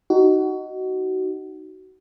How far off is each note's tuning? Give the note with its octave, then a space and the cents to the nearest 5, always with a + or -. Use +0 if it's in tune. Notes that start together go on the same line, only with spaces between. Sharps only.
D#4 +0 F#4 +20